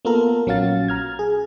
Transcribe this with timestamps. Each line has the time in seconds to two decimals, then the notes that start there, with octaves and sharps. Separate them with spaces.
0.05 A#3 B3 F4 A4 A#4
0.46 A#1 F#3 C#4 F#4 F5 A6
0.88 A#5 F6 G#6
1.19 G#4